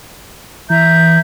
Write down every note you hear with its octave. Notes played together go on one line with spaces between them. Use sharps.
E3 E5 A#5 G6